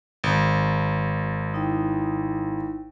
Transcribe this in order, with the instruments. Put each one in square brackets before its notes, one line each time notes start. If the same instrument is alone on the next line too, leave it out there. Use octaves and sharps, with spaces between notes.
[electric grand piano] G#1
[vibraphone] D#4 E4 G5